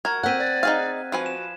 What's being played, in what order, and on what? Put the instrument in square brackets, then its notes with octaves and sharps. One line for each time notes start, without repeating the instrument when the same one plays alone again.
[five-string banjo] F#4 A#4 [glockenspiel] G#6
[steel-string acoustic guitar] C4 F#5 [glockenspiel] F#6 B6 D#7
[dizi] D5
[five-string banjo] D#4 G#4 F5
[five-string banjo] F3 B4 G#5 [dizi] F#4
[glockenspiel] E7